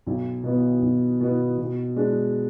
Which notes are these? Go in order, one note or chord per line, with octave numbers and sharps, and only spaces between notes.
B1
B2 B3
B1
B2 B3
B2
G#3 D4